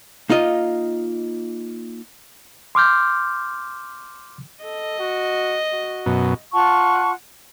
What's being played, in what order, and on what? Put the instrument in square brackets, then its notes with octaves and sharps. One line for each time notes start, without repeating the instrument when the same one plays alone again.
[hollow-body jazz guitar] A#3 D#4 F4 D#5
[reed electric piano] C6 D6 F6 G6
[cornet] A4 [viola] D#5
[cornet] F#4
F#4
[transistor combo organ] F#2 B2
[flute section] F4 F#5 A5 C#6